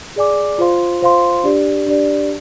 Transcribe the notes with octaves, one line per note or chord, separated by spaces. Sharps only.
G#4 D5 G#5 D6
F4 C5 F5 C6
F4 C5 F5 C6
D4 G4 D5
D4 G4 D5